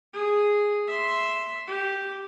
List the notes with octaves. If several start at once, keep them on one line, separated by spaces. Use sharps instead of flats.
G#4
E5 C6
G4